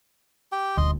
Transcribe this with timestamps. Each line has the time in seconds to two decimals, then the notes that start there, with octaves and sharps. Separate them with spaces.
0.52 G4 G5
0.77 D#1 D2 D#5 C6